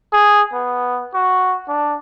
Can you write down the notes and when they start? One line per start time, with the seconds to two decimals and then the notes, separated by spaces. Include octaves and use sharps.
0.13 G#4
0.53 B3
1.14 F#4
1.68 D4